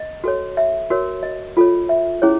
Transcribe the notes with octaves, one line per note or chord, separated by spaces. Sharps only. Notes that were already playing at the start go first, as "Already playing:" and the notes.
Already playing: D#5
F#4 A4 C#5
E5
F#4 A#4 C#5
D#5
F4 A4 C#5
E5
C#4 E4 G#4 C#5